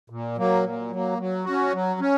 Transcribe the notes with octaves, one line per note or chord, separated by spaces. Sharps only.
A#2
F#3 A#3
A#2
F#3 A#3
F#3
C#4 F#4
F#3
C#4